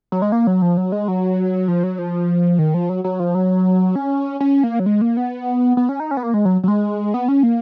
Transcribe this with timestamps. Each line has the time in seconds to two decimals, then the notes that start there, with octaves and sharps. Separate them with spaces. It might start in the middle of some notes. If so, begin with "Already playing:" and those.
0.12 F#3
0.22 G#3
0.32 A#3
0.47 F#3
0.62 F3
0.77 F#3
0.92 G#3
1.08 F#3
1.68 F3
1.83 F#3
1.98 F3
2.59 D#3
2.74 F3
2.89 F#3
3.04 F#3
3.20 F3
3.35 F#3
3.95 C#4
4.40 C#4
4.63 A#3
4.79 F#3
4.86 G#3
5.01 A#3
5.17 B3
5.77 B3
5.89 C#4
6.00 D#4
6.11 C#4
6.17 B3
6.23 A#3
6.34 G#3
6.45 F#3
6.63 F#3
6.68 G#3
7.14 B3
7.28 C#4
7.43 A#3